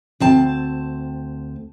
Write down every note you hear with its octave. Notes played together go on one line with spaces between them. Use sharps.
D2 C4 A5